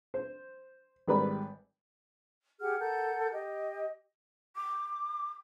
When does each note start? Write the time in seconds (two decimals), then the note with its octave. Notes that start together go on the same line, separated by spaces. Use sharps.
0.14 C5
1.07 G#1 G3 A#4 B4 D5 B5
2.61 G4 G#4 F#5 F6
2.79 A4 A#4 F#5 G6
3.33 G4 D#5
4.56 D6